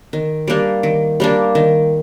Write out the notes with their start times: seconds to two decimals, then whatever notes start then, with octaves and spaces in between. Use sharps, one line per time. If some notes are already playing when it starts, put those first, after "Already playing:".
0.13 D#3
0.47 G3 A#3 D4
0.83 D#3
1.20 G3 A#3 D4
1.55 D#3